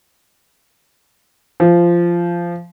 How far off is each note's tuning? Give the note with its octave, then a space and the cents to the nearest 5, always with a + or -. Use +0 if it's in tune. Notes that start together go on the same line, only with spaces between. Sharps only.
F3 -15